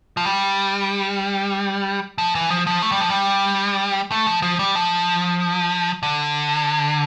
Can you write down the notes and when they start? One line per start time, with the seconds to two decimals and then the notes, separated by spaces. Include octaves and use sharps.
0.17 F3
0.26 G3
2.18 F3
2.35 E3
2.50 F3
2.67 F3
2.82 A3
2.92 G3
3.00 F3
3.09 G3
4.11 A3
4.27 F3
4.42 F3
4.59 G3
4.75 F3
6.03 D3